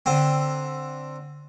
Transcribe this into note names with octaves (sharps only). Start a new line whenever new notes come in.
D3 C4